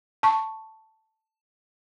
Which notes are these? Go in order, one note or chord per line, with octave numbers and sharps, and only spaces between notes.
A5 C#6